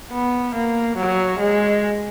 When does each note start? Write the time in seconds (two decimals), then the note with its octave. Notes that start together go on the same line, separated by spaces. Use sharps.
0.12 B3
0.55 A#3
0.97 F#3
1.40 G#3